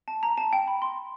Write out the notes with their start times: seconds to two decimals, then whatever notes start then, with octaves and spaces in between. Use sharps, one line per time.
0.08 A5
0.23 A#5
0.37 A5
0.53 G5
0.67 B5
0.82 C6